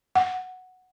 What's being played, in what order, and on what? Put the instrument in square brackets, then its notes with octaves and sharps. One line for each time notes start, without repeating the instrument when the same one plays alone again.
[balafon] F#5